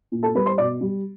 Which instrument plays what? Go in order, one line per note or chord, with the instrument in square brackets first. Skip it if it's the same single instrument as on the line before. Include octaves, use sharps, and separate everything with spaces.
[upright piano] A#2
A4 A5
G3 B4 B5
C5 C6
B2 D5 D6
G3